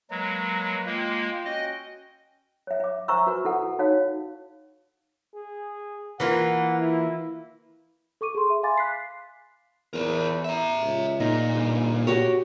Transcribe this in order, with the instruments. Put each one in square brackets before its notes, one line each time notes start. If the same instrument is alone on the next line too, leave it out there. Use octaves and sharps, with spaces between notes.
[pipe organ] F#3 G#3 [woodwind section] A#3 B4 A#5
[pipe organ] G#3 A#3 [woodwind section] F4 G5
[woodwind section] C#4 F#4 G5 [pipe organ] D#5
[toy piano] C#5 E5
E5 D6
C5 E5 G#5 A#5 C#6 E6
F#4 B4
E4 A4 F#5
D#4 F#4 C#5 F5
[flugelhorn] G#4
[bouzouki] E3 A#3 F4 [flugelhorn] F#5
[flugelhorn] E4
[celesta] A4 C#6 D6 D#7
G#4 C6
E5
F5 G#5 B5 C6 D6 A6
F#6 B6 C7
[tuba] E2 [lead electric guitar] A#4 C5
[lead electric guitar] E5 A#5
[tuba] C#2
[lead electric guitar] A#2 [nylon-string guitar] D#4
[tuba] G1
[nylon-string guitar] F#4 G4 C#5